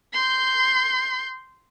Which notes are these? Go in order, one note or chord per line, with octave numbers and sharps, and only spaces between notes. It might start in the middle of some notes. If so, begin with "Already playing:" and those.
C6 G6